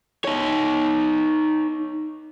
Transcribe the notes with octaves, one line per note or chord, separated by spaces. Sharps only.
D#4 C#5